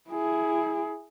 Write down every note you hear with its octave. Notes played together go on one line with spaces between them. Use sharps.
E4 G#4